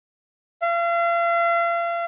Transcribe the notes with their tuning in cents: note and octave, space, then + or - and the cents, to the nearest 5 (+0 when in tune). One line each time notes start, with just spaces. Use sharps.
F5 -40